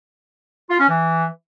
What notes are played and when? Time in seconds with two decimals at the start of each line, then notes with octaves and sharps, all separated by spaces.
0.69 F4
0.79 C#4
0.89 E3